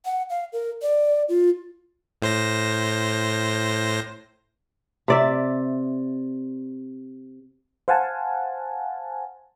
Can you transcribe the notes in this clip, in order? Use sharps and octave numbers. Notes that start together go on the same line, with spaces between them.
F#5
F5
A#4
D5
F4
A2 C5 A#6
C3 D5 E5
C5 F5 F#5 G#5 A5